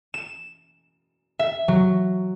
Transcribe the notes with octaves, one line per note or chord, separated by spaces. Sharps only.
E7
E5
F#3